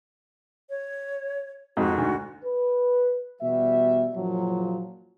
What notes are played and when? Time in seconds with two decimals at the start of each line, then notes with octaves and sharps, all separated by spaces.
0.70 C#5
1.77 F2 G#2 F#4
1.98 D2
2.44 B4
3.41 E2 B2 G3 F#4 E5
4.15 F#1 A#2 F3 F#3